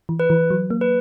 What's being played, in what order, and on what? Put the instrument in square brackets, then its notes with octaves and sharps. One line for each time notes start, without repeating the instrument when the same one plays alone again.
[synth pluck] E3
[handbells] B4
[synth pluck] E3
F#3
A#3
[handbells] B4